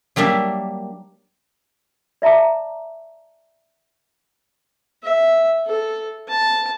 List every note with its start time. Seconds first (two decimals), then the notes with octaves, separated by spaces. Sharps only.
0.16 F#3 G3 A#3 D4 E5
2.22 D5 E5 A5 A#5 D6
5.03 E5
5.66 A4
6.28 A5